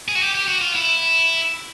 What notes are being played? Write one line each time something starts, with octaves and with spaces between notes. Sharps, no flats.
G#4
F#4
G4
G4
F#4
F4
E4